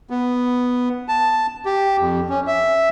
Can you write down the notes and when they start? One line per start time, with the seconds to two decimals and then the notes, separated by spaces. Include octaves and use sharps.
0.10 B3
1.08 A5
1.66 G4
2.00 F2
2.30 C#4
2.47 E5